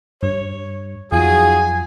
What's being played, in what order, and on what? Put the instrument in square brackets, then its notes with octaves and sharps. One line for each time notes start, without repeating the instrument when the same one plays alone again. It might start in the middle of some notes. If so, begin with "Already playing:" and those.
[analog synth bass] G2 [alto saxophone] C#5
[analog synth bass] F2 [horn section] F#3 D#4 G#4 [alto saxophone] F4 [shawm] G#5